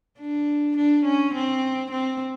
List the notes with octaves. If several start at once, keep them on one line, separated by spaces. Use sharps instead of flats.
D4
D4
C#4
C4
C4